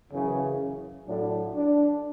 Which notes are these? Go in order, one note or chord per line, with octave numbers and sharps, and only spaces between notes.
F#2 C#3 E3 C#4
A2 F#3 A3 D4
D4